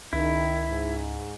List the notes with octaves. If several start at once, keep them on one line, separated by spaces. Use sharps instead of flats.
C#2 D#3 E4
G#2